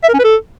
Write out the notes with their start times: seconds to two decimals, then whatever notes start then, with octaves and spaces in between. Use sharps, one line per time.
0.04 E5
0.09 A#4
0.14 C#4
0.19 B4
0.24 A4